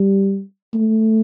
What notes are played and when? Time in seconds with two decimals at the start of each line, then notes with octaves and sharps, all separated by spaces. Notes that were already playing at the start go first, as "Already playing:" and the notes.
Already playing: G3
0.74 A3